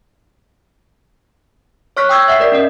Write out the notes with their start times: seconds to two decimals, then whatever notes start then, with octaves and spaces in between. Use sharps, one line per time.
1.97 C#5 C#6 F6 F#6 B6
2.09 G5 C#6 D#6 E6 G6 G#6
2.28 E5 F#5 C7
2.40 A#4 D5 B6
2.52 C#4 A#4 D#5